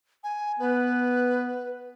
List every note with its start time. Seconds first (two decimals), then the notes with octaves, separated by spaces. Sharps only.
0.24 G#5
0.60 B3 B4